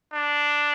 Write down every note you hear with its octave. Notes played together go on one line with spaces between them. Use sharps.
D4